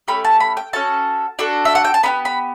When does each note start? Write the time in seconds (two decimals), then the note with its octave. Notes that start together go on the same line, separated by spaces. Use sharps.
0.08 A3 C#4 G4 B5
0.25 A5
0.40 B5
0.57 G5
0.73 C#4 F#4 A4 A5
1.39 D4 F#4 A4
1.65 E5
1.75 F#5
1.84 G5
1.94 A5
2.03 B3 D4 G4 B5
2.25 B5